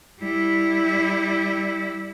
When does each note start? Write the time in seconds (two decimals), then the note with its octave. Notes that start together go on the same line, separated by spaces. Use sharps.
0.20 G3 E4